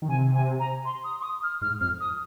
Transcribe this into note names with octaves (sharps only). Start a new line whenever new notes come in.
D#3
C3 G#5
G#5
A#5
C6
D#6
C6
D#6
F6
G#2 F6
F2 F6
D#6